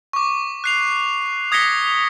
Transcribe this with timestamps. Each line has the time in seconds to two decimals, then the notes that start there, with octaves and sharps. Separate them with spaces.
0.13 C#6 D6
0.64 F#6 C7 F7
1.52 D#6 G#6 A#6 B6 C#7 G7